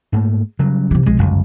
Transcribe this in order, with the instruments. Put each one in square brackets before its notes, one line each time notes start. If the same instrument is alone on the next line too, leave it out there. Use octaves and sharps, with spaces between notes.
[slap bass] G#2 A3 A#3
C#3 F#3 G3
[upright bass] C3 E3
[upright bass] B1 F3 [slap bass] G#3
[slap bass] G1 C#2 [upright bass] F#2